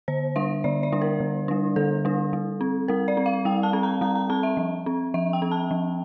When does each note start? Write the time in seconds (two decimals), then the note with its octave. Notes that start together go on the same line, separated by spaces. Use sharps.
0.08 D3 C5
0.36 G3 D4 E5
0.64 D3 D5
0.83 D5
0.92 G3 D4
1.02 A#4
1.20 D3
1.48 G3 D4
1.76 D3 A4
2.05 G3 D4
2.33 G3
2.61 C4
2.88 G3 A#4
3.08 D5
3.17 C4
3.26 F5
3.45 G3 G5
3.63 A5
3.73 C4
3.83 A#5
4.01 G3 A#5
4.15 A#5
4.30 C4 A5
4.43 E5
4.57 F3
4.86 C4
5.14 F3 E5
5.33 G5
5.42 C4
5.52 A5
5.71 F3